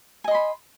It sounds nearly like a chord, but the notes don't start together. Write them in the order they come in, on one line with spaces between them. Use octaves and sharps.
G#5 D#5 C6 B5